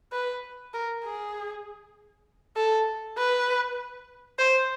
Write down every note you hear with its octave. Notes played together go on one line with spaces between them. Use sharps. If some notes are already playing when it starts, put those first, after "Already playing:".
B4
A#4
G#4
A4
B4
C5